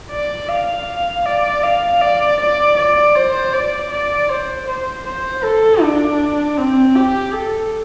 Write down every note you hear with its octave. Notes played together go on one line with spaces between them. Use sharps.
D5
F5
D5
F5
D5
D5
D5
C5
D5
D5
C5
C5
C5
A4
D4
C4
G4
A4